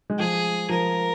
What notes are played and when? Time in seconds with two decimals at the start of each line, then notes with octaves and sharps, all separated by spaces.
0.10 G#3
0.19 F3 G#4
0.69 F3 A#4